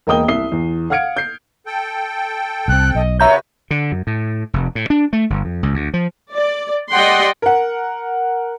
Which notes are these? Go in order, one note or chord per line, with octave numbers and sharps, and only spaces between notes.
E1 A#3 D#5 G5 D#6 G7
C2 E5 D#6 C7 G7
E2
F5 F#5 F6 G#6 C#7 D7
G6 C7
A4 G5
C2 C4 F#6
B1 D#5
C#3 F#4 B4 C#5 E5 A#5 G6
D3
F#2
A2
F1
A2
D4
A3
G1
F2
C#2
D2
F3
D5
G3 D5 D#5 F#5 G5 C6
A#4 F#5